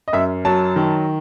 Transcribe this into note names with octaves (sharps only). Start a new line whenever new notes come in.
D#5
F#2 E5
F#3 A5
D#3